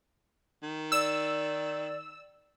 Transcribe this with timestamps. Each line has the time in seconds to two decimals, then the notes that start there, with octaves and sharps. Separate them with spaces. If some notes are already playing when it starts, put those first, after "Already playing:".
0.63 D#3
0.92 D5 E6